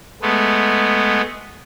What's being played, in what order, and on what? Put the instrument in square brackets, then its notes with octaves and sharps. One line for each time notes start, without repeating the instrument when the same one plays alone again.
[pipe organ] G#3 A3 B3